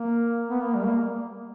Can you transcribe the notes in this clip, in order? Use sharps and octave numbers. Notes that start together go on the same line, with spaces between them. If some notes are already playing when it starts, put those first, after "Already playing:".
Already playing: A#3
B3
A#3
G3
A#3